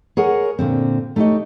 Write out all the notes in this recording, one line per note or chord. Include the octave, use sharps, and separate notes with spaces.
G#4 A#4 C#5 F#5 G#5
A#2 D3 C4
A3 D#4 G4 C5 C#5 D#5